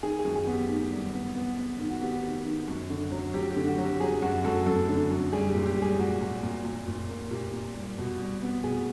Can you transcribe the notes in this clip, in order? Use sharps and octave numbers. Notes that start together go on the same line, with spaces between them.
D#3 G#4
G#4
F#2
G#4
B3
G4
D#3
G3
B3
B3
B3
D#3
F#4
B3 G4
D#3
D#3
F#2
D3
F#3
F#3 G4
G4
D3
F#4
F#3
G4
F#3 G#4
F#2 F#4
F#2 A4
F#2 A4
D3
F#2
G3 G#4
G4
A#2
G4
G3
G#4
A#2 F#4
A#2
A#2
A#2
A#2
A#3
A#2 G4
A#2
G3
B2
G3
B3
B2 G#4